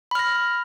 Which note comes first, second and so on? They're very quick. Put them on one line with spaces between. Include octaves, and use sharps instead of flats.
B5 F6 A#6